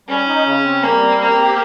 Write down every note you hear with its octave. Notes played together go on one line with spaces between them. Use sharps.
G3 C#4
D#4
C#3
C4
G3 A#3
C4
A#3 C4
G4